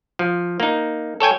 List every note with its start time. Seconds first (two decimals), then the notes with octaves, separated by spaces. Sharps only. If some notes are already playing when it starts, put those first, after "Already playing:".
0.19 F3
0.60 A#3 D#4
1.20 A4 C#5 G5 G#5